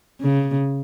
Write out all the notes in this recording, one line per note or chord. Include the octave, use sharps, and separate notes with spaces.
C#3